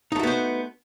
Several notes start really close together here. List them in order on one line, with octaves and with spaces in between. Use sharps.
D#4 A3 F#4 B3 C5